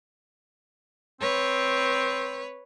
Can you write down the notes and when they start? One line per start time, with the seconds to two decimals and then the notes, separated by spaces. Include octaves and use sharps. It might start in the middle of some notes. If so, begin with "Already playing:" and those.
1.21 C4 B4 C#5